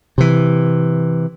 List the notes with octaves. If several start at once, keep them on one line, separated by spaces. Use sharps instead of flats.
C3 E3